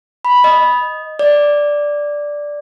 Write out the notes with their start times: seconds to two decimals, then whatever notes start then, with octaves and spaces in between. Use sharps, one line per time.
0.25 B5
0.44 D#5
1.19 D5